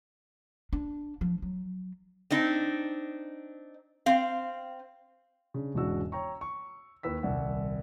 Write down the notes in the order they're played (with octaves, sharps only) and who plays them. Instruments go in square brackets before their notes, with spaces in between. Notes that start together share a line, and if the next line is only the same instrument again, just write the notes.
[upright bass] D4
F3
F#3
[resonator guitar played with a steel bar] C4 D4 D#4
C4 F5
[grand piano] C#3 D4
E1 G#2 C#3 D4 F#4 E6
C#5 G5 A#5 C#6
C#6
D#2 B4 E6 B6
D#1 C2 F#5